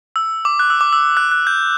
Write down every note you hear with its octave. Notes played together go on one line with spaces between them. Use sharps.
E6
D6
F#6
E6
D6
E6
F#6
F#6
G6